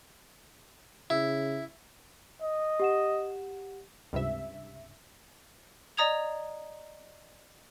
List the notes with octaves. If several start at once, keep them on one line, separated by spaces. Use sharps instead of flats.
C#3 E4
D#5
G4 F#5 E7
C#2 G2 C3 E5
D5 D#5 A#5 D#6 G#6 F7